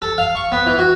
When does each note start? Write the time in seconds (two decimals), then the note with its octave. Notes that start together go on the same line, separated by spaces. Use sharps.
0.02 A4
0.18 F5
0.35 C#6
0.52 B3
0.66 E3
0.79 F#4